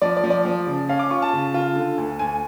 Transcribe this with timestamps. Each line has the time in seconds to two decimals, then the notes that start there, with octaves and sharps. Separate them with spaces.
0.01 F3 D5
0.17 D5
0.24 F3
0.30 D5
0.45 F3
0.67 C#3
0.89 C#4 F5
0.99 D6
1.10 F4 C#6
1.22 A5
1.33 C#3
1.54 F4
1.76 D3
1.98 D2
2.19 D2 G#5